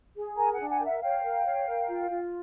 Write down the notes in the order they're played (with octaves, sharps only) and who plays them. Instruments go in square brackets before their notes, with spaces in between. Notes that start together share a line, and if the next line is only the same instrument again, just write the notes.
[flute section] G#4
A#4 G#5 A#5
F#5 G#5
D4
F#5 G#5
A#4 G5
E5 F#5
C#5 F5 G5
A#4
C#5
A#4
F4
F4